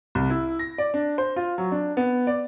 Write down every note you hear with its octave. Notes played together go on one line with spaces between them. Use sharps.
C2
E4
A#6
D5
D4
C5
F4
F#3
D4
B3
D5